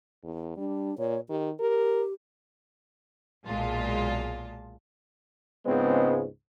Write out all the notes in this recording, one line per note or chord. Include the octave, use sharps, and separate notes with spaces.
E2
G3 D4
A#2 C#5
D#3 G4
G4 A#4
B1 A#2 G#3 F4 A5
C#2 G#2 C#3 G#3 B3 C4